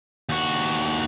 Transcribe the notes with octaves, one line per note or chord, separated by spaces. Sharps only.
D#2 F#4